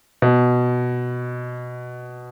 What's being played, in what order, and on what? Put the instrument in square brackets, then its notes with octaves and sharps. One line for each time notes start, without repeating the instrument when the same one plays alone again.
[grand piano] B2